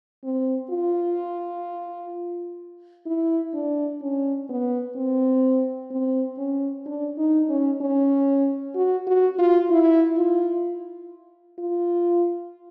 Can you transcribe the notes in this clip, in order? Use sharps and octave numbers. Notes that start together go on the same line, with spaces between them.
C4
F4
E4
D4
C#4
B3
C4
C4
C#4
D4
D#4
C#4
C#4
F#4
F#4
F4
E4
F4
F4